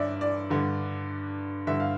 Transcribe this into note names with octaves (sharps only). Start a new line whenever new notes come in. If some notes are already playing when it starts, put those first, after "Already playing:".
Already playing: G2 D3 D5 E5
D5
G2 D3
G2 D3 E5
F5